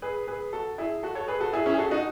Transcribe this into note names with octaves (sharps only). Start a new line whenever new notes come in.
G#4 B4
G#4 B4
F#4 A4
E4 G#4
F#4 A4
A4 C#5
G#4 B4
F#4 A4
E4 G#4
C#4 E4
G#4
F#4 A4
D#4 F#4